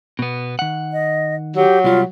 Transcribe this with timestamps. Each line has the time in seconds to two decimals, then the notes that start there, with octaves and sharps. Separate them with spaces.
0.19 B2 B3
0.59 D#3 F#5
0.92 D#5
1.56 F#3 G4
1.84 C2 G3 F4